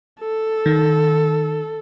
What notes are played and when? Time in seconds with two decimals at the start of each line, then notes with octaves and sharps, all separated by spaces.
0.20 A4
0.66 D#3